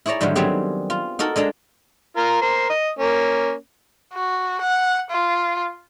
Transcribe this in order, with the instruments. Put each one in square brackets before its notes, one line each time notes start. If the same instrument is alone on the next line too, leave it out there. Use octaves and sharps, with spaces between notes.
[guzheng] E4 G#4 C#5 D5 A#5
G#2 D3 D#3 F#3 G3
F#3 G3 B3 C4 G4 G#4
F4
D#4 F#4 A4 A#4
G#3 D4 A4 A#5
[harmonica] F4 A#4
A#4 C5
D#5
A#3 C#4
[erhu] F#4
F#5
F4